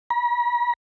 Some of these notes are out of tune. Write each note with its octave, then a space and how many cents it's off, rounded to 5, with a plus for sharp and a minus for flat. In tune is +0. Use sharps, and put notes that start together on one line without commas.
B5 -45